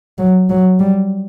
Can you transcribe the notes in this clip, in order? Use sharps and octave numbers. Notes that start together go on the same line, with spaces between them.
F#3
F#3
G3